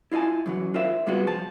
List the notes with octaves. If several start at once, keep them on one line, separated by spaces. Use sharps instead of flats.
E4 F4 D#5 G#5 A5
F#2 E3 F#3
F4 A#4 C5 D5 E5 F5
C3 G3 G#3 B3 F4 F#4
F3 A5